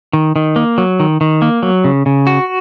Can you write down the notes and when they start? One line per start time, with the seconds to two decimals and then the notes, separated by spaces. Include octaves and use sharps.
0.13 D#3
0.36 D#3
0.56 A#3
0.78 F#3
1.00 D#3
1.21 D#3
1.42 A#3
1.63 F#3
1.84 C#3
2.06 C#3
2.27 F#4